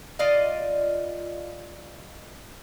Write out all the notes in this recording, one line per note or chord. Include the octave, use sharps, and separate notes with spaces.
F4 D5 D#5 F5